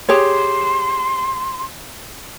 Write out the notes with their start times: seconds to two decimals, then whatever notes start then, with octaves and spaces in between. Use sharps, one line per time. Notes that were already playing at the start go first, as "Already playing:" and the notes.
0.09 G4 G#4 C#5 C6